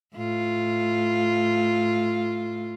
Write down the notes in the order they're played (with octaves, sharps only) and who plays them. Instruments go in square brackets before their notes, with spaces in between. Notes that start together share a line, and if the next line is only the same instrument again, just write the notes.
[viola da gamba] A2 F4